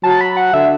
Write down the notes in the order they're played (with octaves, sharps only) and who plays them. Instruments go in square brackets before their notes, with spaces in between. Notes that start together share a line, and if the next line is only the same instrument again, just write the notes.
[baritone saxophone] F#3 [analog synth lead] A5
[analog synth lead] B5
F#5
[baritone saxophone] D3 [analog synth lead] E5